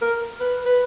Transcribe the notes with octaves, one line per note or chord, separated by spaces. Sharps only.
A#4
B4
B4